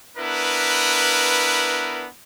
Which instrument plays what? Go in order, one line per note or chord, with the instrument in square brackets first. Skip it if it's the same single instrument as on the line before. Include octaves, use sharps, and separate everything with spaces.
[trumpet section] B3 D4 E4 A#4 B4